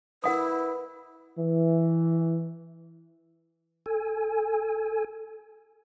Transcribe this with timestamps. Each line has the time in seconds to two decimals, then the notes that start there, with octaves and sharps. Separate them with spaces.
0.24 E4 A#4 B4 F#5 D#6
1.38 E3
3.86 A4 G#5